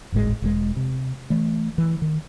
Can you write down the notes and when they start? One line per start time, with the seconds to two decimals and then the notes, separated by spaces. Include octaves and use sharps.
0.12 D#1 G#1 A2 G#3
0.42 E1 A#2 G#3
0.76 C3
1.30 E3 A3
1.78 E3
2.02 D#3